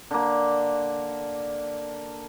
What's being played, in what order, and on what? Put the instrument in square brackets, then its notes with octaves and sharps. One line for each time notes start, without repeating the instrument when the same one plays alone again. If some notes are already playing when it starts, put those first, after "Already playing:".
[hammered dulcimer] D3 A#3